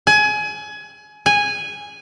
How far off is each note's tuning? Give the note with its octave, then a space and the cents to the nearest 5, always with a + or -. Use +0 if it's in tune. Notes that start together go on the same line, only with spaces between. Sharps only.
G#5 +25
G#5 -10